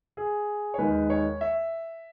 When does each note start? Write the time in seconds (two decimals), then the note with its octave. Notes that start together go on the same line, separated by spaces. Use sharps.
0.17 G#4
0.74 C#5
0.78 D#2 D#3 G#3 B4
1.10 C#5
1.41 E5